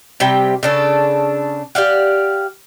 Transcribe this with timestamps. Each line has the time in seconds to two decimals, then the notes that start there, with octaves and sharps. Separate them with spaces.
0.20 C3 G3 G4 G5
0.63 C#3 D4 A4
1.75 G4 D5 F5 F#5